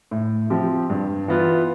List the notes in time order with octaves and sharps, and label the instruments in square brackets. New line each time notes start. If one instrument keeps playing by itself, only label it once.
[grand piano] A2
F3 C4 G4
G2
E3 B3 F4